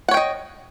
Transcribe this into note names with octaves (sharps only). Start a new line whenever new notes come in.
C#5 D#5 F#5 G5